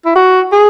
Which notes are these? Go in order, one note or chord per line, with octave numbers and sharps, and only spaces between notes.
E4
F#4
G#4